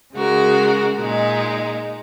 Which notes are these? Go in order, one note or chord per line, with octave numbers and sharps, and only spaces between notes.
C#3 G#3 F#4 A#4
A#2 G#3 D#4